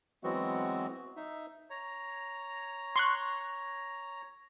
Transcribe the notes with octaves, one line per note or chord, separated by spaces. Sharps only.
E3 F#3 G#3 B3 C4 F#4
D#4 E5
C#5 A#5
C6 C#6 F#6